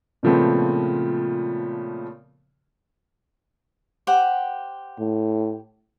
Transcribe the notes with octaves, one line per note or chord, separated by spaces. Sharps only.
A#2 C#3 F3 A3 B3 C4
G4 C5 F#5
A2